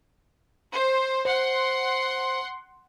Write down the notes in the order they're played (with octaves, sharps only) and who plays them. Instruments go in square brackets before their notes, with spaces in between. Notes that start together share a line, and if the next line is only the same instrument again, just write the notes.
[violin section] C5
[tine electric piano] C5 [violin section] F#5 C6